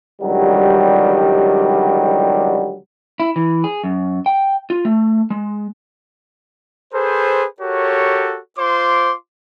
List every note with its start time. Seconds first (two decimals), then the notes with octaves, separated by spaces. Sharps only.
0.22 C#2 D3 D#3 F#3 G3
3.20 E4
3.36 E3
3.64 G#4
3.84 F#2
4.26 G5
4.70 F4
4.85 A3
5.30 G#3
6.93 G#4 A4 B4 C5
7.60 F#4 G4 A4 A#4 C#5
8.58 F4 C5 C6 D6